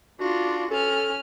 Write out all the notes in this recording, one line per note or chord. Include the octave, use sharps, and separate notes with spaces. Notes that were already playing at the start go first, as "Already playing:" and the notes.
D4 F4 F#4
C#4 A4 F6